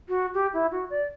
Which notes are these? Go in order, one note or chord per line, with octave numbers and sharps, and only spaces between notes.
F#4
G4
E4
F#4
D5